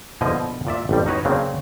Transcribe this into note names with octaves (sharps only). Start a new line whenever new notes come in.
A#1 B2 D3 F3 E4 D#5
A#2 D5 E5
A1 F2 G3
D#4 F#4 B4 C#5
C#3 F#3 A#3 C4 D4